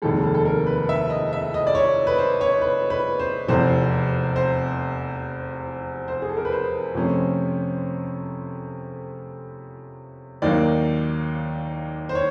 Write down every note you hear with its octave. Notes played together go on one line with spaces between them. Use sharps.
F1 D#2 D#3 G#3 A4
A4
A4
A#4
B4
E5
D#5
E5
D#5
D5
C#5
B4
C5
C#5
B4
B4
C5
F1 E2 C3 C5
C5
C5
G#4
A4
A#4
B4
C5
F2 C3 F3 A3 C#4
D#2 D#3 F#3 A#3 D5
C5
C#5